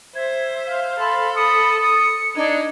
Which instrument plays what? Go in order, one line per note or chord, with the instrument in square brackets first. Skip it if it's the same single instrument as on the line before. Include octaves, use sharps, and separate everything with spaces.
[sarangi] C5 [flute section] E5 [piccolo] G#6
[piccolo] F5
[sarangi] A4 [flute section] B5 C6
[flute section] B5 D#6 [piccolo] C#7
[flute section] D#6
[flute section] D4 G#6 [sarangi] D#4